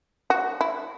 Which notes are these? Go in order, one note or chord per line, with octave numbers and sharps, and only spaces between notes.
F#4
E4